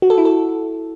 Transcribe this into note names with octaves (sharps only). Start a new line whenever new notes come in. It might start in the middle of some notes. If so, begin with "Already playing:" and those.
F#4
A4
E4
A4